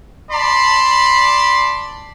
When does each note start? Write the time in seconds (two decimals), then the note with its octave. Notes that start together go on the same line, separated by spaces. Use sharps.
0.32 D5 A5 B5 C6